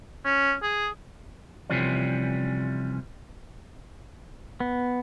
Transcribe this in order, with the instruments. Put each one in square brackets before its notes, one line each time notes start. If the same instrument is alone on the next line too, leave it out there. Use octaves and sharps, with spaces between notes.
[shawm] C#4
G#4
[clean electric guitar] C3 E3 F3 G3 C#4
[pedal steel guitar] B3